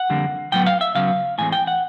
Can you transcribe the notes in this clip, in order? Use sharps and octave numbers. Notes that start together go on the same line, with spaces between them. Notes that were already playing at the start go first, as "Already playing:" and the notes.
Already playing: F#5
F2 D3 G3 A#3
A2 F#3 B3 G5
F5
E5
C#3 F#3 B3 F5
A2 E3 G#3 C4 G#5
G5
F#5